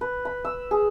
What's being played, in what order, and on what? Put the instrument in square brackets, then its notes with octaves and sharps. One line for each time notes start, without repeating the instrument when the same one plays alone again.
[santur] B4
B5
E6
G#4